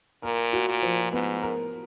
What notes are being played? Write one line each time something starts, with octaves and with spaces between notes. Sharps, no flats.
A#2 A#4
F#4
A#2
F3
G#2 B3
A#4